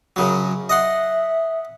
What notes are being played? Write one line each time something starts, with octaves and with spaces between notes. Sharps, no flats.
F#2 C#3 F#3
D#5 E5 F#5 C6